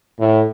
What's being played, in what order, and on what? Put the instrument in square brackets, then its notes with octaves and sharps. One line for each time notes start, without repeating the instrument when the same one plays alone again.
[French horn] A2